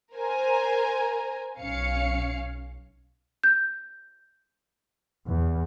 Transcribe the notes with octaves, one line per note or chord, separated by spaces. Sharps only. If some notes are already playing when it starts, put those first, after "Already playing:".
A#4 C5 G#5 A#5
B1 C#4 F5 C#7
G6
E2